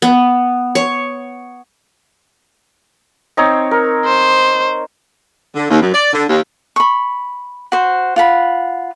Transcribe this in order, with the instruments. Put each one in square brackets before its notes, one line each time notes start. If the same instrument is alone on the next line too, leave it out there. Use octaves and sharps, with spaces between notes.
[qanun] B3
C#5
[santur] C4 D#4 C#5
A#4
[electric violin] C5
[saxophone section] D3
D#2
F#2
D5
D3
D#2
[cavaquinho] B5 C#6
F#4 C5
F4 F#5 B5